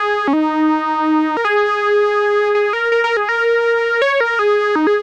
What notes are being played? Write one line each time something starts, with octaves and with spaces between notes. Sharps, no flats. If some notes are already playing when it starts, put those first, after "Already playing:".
Already playing: G#4
C#4
D#4
A#4
G#4
G#4
A#4
A#4
A#4
G#4
A#4
C#5
A#4
G#4
D#4
G#4